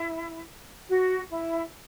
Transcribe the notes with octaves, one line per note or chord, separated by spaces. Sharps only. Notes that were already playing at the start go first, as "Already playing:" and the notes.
Already playing: E4
F#4
E4